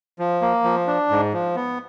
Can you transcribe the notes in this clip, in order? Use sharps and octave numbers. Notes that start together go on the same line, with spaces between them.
F3
A#3
F3
D4
G#2
F3
B3